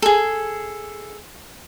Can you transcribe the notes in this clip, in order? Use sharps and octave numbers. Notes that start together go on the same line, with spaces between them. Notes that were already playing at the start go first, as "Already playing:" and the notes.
G#4 A4